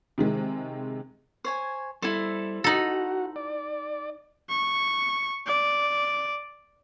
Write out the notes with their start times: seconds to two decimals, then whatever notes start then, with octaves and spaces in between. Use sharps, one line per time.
0.18 C3 D#3 G#3
1.44 C5 C#5 G#5
2.02 G3 E4 A4 C5
2.64 D#4 F#4 A4 A#5 B5
3.36 D5
4.49 C#6
5.46 D5